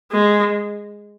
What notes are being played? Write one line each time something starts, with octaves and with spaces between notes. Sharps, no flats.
G#3